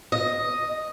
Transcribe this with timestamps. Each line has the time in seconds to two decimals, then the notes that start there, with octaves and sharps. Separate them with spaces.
0.12 D#5